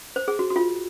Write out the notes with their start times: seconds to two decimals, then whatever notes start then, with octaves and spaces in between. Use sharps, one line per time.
0.16 C5
0.28 G#4
0.39 F#4
0.50 F#4
0.56 F4